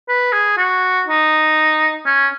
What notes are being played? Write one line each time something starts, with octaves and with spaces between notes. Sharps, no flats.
B4
G#4
F#4
D#4
C#4